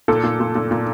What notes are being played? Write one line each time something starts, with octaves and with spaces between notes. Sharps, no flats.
A#2 A4
A#2
A#2
A#2
A#2